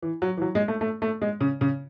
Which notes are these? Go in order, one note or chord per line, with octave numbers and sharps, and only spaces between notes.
E3
F#3
E3
F#3
G#3
A3
A3
A3
G#3
C#3
C#3